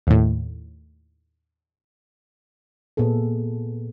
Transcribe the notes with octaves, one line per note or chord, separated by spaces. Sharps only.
D#2 A2
A#2 B3 G#4 A4